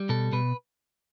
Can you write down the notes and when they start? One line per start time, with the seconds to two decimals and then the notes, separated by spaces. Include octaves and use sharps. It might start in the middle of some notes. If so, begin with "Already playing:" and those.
Already playing: G3
0.09 B2 A4
0.32 B2 B4